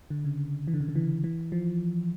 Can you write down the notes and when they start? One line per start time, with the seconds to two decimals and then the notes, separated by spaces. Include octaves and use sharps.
0.10 D3
0.25 C#3
0.68 E3
0.74 D3
0.81 C#3
0.88 D3
0.96 E3
1.24 E3
1.52 F3